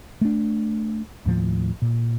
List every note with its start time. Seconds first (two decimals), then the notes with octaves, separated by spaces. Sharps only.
0.21 A3 D4
1.26 D#2 A2 F3
1.82 A#2